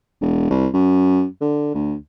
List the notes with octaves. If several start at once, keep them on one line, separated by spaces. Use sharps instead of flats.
E1
C2
F#2
D3
D2